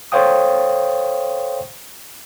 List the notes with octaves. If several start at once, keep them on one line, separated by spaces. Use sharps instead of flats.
A4 C5 C#5 F5 G5 D#6